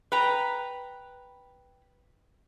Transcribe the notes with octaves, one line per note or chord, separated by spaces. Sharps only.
B4 G5 A#5